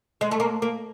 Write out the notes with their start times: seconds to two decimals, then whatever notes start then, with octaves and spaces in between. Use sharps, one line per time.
0.21 G#3
0.31 A3
0.40 A#3
0.62 A#3